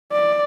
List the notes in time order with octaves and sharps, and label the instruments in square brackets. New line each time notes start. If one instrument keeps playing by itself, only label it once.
[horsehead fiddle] D5